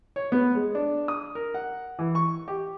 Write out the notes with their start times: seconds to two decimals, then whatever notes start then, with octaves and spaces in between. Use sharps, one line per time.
0.16 C#5
0.32 B3
0.55 G#3
0.75 D4
1.08 D#6
1.35 A#4
1.54 F#5
1.99 E3
2.15 C#6
2.48 G4